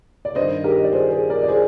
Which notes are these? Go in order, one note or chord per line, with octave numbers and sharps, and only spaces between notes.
D5
G2 D#3 C5 D#5
G4 A#4
D#5
D5
G#4 C5
G#4 C5
A#4 D5
D5
G#4 C5